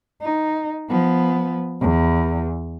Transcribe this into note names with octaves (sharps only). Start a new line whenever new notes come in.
D#4
F3 B3
E2